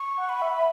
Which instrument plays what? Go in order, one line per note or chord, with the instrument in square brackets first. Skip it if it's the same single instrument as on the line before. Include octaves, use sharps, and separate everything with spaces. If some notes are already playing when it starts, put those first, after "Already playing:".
Already playing: [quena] C#6
[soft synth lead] F#5
[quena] B5
[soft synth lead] F#5
E5